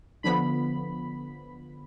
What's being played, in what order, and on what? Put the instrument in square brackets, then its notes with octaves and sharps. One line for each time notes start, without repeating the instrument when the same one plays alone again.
[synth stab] D3 F3 B3 B5